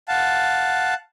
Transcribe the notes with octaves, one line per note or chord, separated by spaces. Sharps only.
F5 F#5 A5